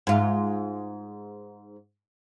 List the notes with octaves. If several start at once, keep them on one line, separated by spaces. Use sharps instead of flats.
G#2 F4